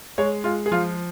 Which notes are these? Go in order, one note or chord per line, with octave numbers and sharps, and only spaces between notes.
G#3 C#5
G#3 F4
G#4
F3 F4